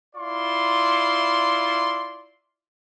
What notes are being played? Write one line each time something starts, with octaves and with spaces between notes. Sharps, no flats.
E4 F4 D5 C6